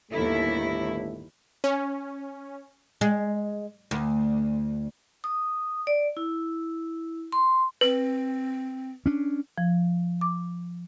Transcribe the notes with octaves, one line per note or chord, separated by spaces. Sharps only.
G1 D#2 A2 A3 E4
C#4
G#3
D2
D#6
D5
E4
C6
C4 B4
C#4 D4
F3
D6